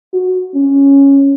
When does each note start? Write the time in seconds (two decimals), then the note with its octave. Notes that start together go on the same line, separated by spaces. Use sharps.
0.13 F#4
0.54 C#4